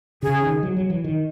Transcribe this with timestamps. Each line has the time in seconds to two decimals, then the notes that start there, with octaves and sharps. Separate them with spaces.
0.23 C#3 G#4
0.42 D#3
0.63 F#3
0.77 F#3
0.90 E3
1.04 D#3